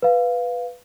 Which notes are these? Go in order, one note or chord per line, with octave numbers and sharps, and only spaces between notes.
B4 F5